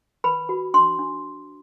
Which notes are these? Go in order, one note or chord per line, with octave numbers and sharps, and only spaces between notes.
B4 B5
F#4
D4 C6
D4